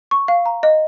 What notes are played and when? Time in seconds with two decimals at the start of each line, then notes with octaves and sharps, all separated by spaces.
0.11 C#6
0.28 F5
0.46 A#5
0.63 D#5